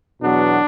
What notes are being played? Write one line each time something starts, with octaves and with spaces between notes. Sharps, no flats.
E2 B2 F#3 B3 D4